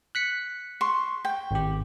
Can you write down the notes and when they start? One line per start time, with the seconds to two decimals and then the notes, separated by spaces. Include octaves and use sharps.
0.15 F#6 B6 C#7
0.81 C6 C#6
1.25 G5
1.51 G#1 G4